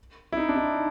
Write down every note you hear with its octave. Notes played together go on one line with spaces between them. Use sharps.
E4
D#4
D4
D#4